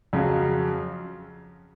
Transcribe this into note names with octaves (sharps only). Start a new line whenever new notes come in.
F2 C#3 F#3